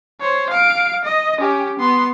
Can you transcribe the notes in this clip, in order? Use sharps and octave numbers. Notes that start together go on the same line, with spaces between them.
C5 C#5
F5 D7
D#5
C#4 G4
B3 C6